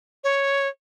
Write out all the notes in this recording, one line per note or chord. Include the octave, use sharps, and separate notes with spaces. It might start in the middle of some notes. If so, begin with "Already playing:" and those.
C#5